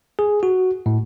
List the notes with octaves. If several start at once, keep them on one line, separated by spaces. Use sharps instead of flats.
G#4
F#4
A2